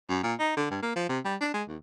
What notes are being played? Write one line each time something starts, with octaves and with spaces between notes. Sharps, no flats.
F#2
A#2
D#4
D3
G2
A#3
F3
C3
G3
D4
G#3
D#2